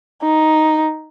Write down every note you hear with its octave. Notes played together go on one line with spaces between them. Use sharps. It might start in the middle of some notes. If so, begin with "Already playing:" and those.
D#4